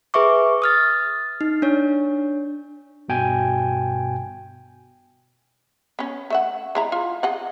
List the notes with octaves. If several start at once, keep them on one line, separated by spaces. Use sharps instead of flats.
G#4 B4 E5 C#6 D6
D#6 F6 A6
D#4
D4 C#5
G2 B2 G5 G#5
B3 C#4
A3 E5 F#5
G#3 E4 A#5
F4
G#4 D#5 F#5